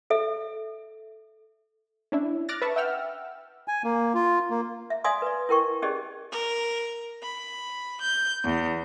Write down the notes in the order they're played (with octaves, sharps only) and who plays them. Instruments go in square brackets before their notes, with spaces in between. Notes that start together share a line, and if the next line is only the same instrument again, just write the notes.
[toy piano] A4 E5
[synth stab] C#4 D4 E4
D6 F6 F#6 A6 A#6
B4 E5 A5 C#6
E5 F#5 G5 E6 F6
[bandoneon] G#5
A#3
F4
A#3
[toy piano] E5
D5 E5 F5 G#5 C6 D#6
B4 D5
E4 A#4 G5 C#6
C#4 G4 G#4 D5 D#5
[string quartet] A#4
B5
G6
E2